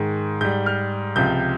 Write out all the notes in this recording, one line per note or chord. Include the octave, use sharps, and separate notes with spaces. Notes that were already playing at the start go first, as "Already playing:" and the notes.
Already playing: G#2 D#3 G#3
G#2 G3 G6
F6
C#2 C3 F3 G6